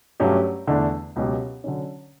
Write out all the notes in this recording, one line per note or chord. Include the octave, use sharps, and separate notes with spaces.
G2 F#3 A3 C#4 G4
E2 D3 A3 D4
C#2 B2 F#3 C#4 G4
D3 F#3 C#4